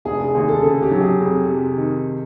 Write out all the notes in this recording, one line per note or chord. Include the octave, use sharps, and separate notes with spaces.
F1 G#4
G#4
D#2 G#4
A4
C#3 A4
G4
F#3
G#4
F2
C3
D#3